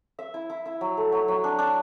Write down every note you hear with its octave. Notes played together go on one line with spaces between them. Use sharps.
E5
E4
E4
E4
F#3
A3
F#3
F#3
D4
D4